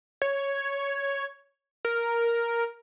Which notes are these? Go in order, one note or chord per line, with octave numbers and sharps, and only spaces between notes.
C#5
A#4